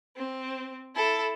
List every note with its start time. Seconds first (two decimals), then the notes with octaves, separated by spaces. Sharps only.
0.16 C4
0.95 E4 A4